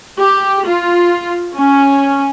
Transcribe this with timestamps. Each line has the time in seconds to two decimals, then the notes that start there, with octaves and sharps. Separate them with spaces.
0.17 G4
0.66 F4
1.57 C#4